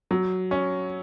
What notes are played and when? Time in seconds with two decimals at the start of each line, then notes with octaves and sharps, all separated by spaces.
0.11 F#3
0.51 C#4